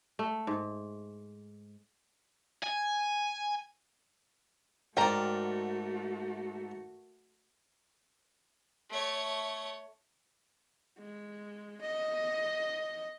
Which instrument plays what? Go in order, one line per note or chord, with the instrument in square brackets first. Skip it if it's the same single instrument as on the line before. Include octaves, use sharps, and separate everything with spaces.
[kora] A3
G#2
[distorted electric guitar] G#5
[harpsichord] G#2 [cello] A3 F#4 [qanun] A#4 D5 [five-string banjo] G5 A#5
[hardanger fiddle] A3 C#5
[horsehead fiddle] G#3
D#5